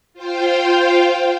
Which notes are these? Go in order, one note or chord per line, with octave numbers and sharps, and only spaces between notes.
F4 C5 F5 G5